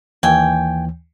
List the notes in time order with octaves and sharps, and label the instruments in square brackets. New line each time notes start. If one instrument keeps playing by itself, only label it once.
[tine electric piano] D#2 E3 [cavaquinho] G5 G#5